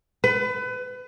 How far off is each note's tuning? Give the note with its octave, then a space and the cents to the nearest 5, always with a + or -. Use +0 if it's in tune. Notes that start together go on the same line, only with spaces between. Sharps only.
B4 +30